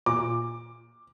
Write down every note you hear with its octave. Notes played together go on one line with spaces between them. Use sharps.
A#2 D6